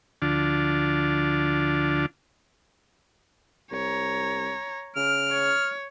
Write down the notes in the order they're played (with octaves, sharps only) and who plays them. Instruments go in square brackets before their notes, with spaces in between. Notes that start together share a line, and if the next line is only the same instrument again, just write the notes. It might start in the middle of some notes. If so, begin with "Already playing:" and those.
[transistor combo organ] D2 D3 F3 D4 F4 A5
[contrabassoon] C2 [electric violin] C#5 A#5
[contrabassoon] C#3 [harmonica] F6 [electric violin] D7
[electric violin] C#5